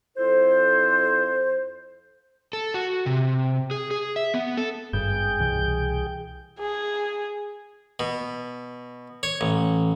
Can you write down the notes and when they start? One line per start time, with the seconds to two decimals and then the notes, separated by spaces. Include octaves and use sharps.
0.17 F2 E4 A4 C5
2.53 A4
2.74 F#4
3.06 C3
3.71 G#4
3.91 G#4
4.16 E5
4.34 B3
4.57 A4
4.93 G#1 G2 G#4 G5 G6
5.40 C2 B2 E3
6.59 G#4
8.00 B2
9.23 C#5
9.41 A1